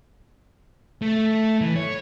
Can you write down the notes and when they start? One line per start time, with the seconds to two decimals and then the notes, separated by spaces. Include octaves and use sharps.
1.02 A3
1.61 E3
1.76 C#5